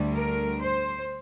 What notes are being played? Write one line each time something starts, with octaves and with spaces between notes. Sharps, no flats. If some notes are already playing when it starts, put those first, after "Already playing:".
Already playing: D2 D3 G3
A#4
C5